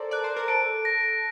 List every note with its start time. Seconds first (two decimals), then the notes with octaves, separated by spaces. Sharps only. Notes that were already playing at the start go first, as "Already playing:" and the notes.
Already playing: A4 A#4 C5 D5
0.11 D5 F#6
0.24 C5
0.36 A#4
0.48 A4 D7
0.85 A#6